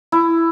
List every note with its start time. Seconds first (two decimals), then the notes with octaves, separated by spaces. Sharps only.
0.12 E4